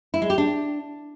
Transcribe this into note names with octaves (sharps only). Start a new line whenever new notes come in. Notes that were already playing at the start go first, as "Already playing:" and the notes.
E4
G#3
G4
D4